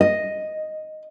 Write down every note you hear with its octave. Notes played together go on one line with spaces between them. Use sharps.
D#5